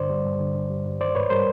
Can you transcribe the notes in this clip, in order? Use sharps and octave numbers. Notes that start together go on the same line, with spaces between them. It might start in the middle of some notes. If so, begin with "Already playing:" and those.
Already playing: G2 D3 C5 D5
G3
G2
D3
G2
G3
G2
D#3 C5 D5
G#2 B4 C#5
G3 A#4 C5